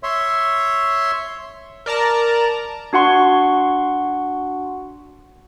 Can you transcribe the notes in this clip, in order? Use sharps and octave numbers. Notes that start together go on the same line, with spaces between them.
C#5 E5 C6
A#4 D5 A5 A#5
D4 F#4 F#5 C6 C#6